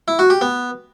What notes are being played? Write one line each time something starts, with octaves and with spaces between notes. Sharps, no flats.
E4
F#4
G4
B3